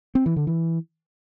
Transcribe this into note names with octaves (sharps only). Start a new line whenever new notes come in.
C4
E3
D3
E3